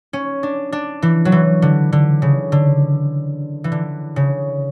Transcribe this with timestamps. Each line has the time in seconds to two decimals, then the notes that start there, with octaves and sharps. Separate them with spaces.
0.13 C#4
0.43 D4
0.72 D4
1.02 E3
1.25 F#3
1.32 E3
1.62 D3
1.92 D3
2.22 C#3
2.52 D3
3.64 E3
3.72 D3
4.16 C#3